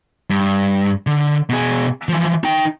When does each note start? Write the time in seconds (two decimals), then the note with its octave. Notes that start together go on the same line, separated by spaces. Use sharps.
0.30 G2
1.07 D3
1.49 B2 G#4
2.09 E3 F3
2.44 D#4 G5